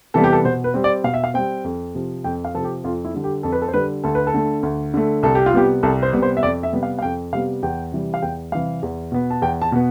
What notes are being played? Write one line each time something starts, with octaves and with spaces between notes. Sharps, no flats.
C3 E3 G3 B3 A4
G4
A4
B2 C5
B4
G3 C4
D5
B2 F5
E5
F5
G3 C4 G5
F2
C3 F3
F2 G5
F5
C3 F3 A4
G4
F2 F4
E4
D3 G3
G4
F2 A4
B4
A4
C5
D3 G3 B4
D2 A4
B4
A4
D3 A3
D2
D3 A3
C2 A4
G4
F4
C3 G3 B3 G4
C2 A4
C5
C3 G3 B3
C5
E5
F2 D5
E5
C3 G3 B3
F5
F5
F2 G5
C3 G3 B3 F5
E2 G5
C3 E3 G3
F5
E2 G5
C3 E3 G3 F5
E2
B2 B3
A5
E2 G5
A5
B2 B3